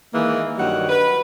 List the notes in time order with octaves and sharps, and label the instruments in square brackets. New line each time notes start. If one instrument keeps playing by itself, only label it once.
[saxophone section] D#3 E3 G#3 A#3
G2 D#3 F#3 G3 F#4 F#5
B4